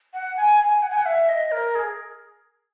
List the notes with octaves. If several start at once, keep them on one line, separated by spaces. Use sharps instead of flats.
F#5
G#5
G#5
F#5
G#5
F#5
E5
D#5
A#4
G#4